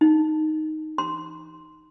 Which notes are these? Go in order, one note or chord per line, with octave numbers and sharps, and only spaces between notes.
D#4
C6